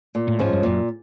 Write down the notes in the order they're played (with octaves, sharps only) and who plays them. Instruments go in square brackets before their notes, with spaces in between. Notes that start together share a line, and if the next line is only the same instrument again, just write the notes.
[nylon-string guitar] A#2
[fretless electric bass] A2
[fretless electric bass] G#2 [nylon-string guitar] F3 G#3 C#4
[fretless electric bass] G2
[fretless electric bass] F#2 [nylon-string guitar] A#2